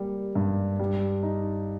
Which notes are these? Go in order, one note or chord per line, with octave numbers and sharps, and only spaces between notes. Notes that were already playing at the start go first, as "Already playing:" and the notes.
Already playing: G3 A#3
G2
G3
D#4